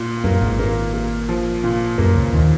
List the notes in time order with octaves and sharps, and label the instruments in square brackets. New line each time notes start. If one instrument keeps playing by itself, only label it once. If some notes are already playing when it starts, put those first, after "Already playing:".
Already playing: [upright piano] A#2
[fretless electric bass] F#2 [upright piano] A#3
[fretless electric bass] G#1 G#2
[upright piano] A#3
A#3
F3
A#2
[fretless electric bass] F#2 [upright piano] A#3
[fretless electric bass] C#2 C#3
[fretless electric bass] D#2 D#3 [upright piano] A#2